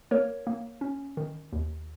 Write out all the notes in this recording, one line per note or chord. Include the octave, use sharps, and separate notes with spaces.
A#3 A#4 C#5
A#3
C#4
D#3
D#2